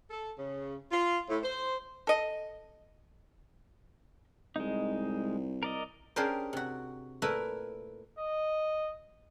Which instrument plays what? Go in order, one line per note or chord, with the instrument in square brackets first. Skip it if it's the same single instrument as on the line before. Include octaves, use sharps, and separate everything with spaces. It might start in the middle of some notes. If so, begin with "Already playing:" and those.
[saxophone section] A4
C#3
F4
A2
C5
[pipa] A4 D#5
[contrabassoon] C2 [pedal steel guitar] G#3 D#4
[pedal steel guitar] A#4 D5 D#5
[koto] C#4 D4 G4 G#4 A#4 C5
C3 F#4
A#2 A3 E4 A#4 B4 E5
[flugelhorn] D#5